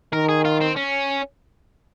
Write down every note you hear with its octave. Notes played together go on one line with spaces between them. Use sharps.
D#3 A#4
G#4
F4
C4
C#4